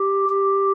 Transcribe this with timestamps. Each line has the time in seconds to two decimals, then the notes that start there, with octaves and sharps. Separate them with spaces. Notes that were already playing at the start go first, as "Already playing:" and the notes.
Already playing: G4
0.29 G4